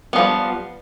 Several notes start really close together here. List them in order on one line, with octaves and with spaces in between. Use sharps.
B3 F3 G3